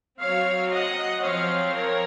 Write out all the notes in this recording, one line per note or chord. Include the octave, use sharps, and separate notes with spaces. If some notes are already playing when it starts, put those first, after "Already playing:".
F#3 C4 C#5 F5
D#5 F#5
F3 C4 C#5 F5
A#4 C#5